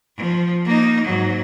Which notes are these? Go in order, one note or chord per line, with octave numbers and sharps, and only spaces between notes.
F3
A#3 D#4
G#2 F#3